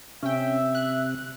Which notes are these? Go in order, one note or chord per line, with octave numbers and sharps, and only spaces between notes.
C3 C#4 E5 G5
F#6